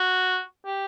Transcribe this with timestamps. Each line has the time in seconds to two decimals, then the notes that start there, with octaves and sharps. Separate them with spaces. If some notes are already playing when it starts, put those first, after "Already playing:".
Already playing: F#4
0.65 G4